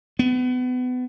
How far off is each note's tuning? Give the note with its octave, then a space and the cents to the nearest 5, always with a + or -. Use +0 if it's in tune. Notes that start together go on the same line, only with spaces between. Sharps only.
B3 +30